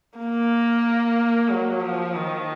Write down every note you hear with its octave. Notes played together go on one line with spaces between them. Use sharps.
A#3
F#3
F3
D#3